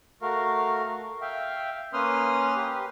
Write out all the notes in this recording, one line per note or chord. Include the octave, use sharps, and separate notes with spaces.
A3 F#4 A#4 F5
E5 F5 G5
A#3 C#4 B4 C6 D#6 F6
G4 B4